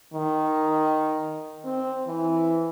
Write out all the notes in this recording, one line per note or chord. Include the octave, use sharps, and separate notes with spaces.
D#3
C4
E3